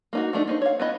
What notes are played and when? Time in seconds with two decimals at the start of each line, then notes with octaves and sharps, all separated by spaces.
0.13 A#3 D#4 F#4
0.33 F3 A3 D4 D#4
0.47 A#3 D#4 C5
0.62 C#5 F5
0.80 B3 E4 D#5